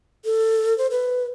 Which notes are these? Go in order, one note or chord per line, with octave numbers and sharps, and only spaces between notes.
A4
C5
B4